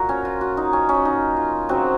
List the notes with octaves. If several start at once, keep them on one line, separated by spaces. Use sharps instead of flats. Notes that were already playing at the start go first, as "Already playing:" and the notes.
Already playing: A#2 F#4 A#4
C#4
F4
F#4
D#4
C#4
C#4
D#4
F4
C#3 F#3 C4 F#4